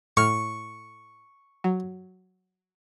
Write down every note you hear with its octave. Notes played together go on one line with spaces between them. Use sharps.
A2 C#6 F6
F#3